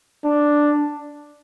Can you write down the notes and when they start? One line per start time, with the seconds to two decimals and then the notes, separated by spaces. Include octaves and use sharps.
0.24 D4